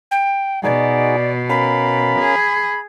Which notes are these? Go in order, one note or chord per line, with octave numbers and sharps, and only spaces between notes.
G5
B2 D#4 F#4 G#4 D5
C#4 A#4 F5 B5
G#4